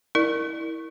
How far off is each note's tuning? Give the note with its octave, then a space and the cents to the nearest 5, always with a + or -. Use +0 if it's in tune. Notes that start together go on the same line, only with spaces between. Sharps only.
E4 -15 A#4 +0 D5 +25